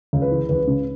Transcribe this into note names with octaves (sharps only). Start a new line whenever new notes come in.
C#2
B4
E3
C#2 B4
C#3